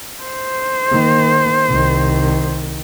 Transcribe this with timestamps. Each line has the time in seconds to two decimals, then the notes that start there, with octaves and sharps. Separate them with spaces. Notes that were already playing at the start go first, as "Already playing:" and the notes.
0.24 C5
0.91 D#3 A#3
1.68 C2 D#3